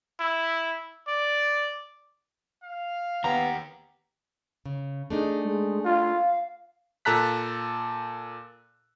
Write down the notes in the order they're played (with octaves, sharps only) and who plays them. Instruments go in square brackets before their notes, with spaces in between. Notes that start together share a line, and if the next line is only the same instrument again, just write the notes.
[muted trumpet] E4
D5
[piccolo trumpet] F5
[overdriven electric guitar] D#2 G4 [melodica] B3 [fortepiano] A#5
[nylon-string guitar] C#3
[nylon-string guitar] A3 D4 D#4 [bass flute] G#4
[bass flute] G#3
[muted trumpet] F4 [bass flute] F5
[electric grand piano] A#2 A4 A5 A#5 F#6 B6